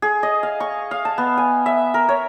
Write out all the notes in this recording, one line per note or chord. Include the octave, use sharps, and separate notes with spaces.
G#4
D#5
F5
C#6
F5
A5
B3
G#5
E5
A#4
C#5